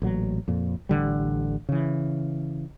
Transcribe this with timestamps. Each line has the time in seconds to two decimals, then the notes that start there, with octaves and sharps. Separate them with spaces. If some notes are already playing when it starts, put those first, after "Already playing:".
0.02 A1 A#2 F#3
0.48 F2 A#2
0.89 A1 D3 G3
1.69 C#3 E3